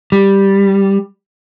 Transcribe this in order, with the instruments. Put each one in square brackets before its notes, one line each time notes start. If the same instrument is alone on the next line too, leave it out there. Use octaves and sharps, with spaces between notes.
[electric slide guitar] G3